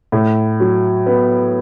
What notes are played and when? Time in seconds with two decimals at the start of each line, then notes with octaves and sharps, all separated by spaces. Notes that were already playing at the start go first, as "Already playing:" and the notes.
0.12 A2
0.60 F#3
1.06 B3